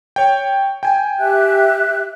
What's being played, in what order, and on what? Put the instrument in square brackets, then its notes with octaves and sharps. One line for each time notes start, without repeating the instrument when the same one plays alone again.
[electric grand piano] C#5 G5
G5 G#5
[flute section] G4 E5 F#6